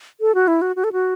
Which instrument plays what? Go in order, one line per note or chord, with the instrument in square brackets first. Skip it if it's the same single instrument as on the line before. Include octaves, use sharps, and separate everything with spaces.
[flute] A4
F#4
E4
F#4
F#4
A4
F#4